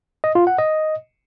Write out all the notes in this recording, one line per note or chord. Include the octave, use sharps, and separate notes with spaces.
D#5
F4
F#5
D#5